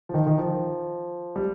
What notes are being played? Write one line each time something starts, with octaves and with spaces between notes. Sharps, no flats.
F3
D#3
D#3
F3
G3